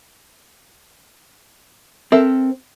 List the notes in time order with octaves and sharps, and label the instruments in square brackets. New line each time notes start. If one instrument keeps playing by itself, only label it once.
[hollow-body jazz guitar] C4 [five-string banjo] A4 A#4 E5